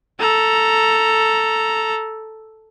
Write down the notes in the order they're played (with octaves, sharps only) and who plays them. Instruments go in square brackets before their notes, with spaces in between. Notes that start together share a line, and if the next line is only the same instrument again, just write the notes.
[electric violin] A4 A#5